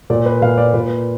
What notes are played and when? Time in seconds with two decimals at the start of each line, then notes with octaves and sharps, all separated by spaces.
0.10 A#2 D5
0.26 B4
0.42 A#2 F5
0.58 D5
0.74 A#2 B4